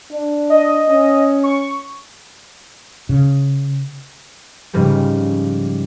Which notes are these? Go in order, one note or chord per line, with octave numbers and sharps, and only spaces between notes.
D4
D#5
C#4
C#6
C#3
G#2 C#3 F3 G3